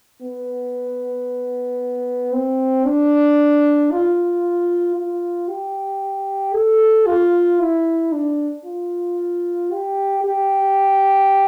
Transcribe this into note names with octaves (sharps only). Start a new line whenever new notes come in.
B3
C4
D4
F4
F4
G4
A4
F4
E4
D4
F4
G4
G4